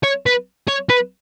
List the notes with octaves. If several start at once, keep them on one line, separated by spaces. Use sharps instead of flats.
C#5
B4
C#5
B4